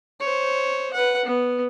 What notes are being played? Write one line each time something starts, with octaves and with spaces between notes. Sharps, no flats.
C5 C#5
B4 F#5
B3